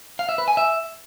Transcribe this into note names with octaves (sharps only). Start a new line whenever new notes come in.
F5
E5
B4
G#5
E5